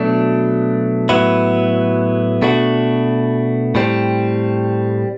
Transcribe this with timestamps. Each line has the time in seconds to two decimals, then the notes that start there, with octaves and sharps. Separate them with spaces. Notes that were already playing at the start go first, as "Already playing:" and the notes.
Already playing: B2 F#3 A3 D4
1.09 A2 F#3 B3 E4
2.42 B2 A3 D4 F#4
3.75 A2 G3 C4